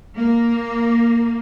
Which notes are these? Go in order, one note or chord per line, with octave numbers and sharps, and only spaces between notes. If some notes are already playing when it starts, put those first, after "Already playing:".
A#3